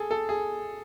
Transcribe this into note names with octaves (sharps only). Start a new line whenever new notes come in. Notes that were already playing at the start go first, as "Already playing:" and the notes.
Already playing: G#4 A4
A4
G#4